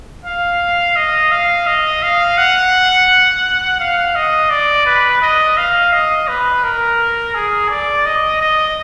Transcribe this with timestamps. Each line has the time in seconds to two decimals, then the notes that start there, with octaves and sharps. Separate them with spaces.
0.25 F5
0.96 D#5
1.32 F5
1.67 D#5
2.03 F5
2.38 F#5
3.80 F5
4.15 D#5
4.51 D5
4.86 B4
5.22 D#5
5.57 F5
5.93 D#5
6.28 B4
6.64 A#4
7.35 G#4
7.70 D5
8.06 D#5
8.41 D#5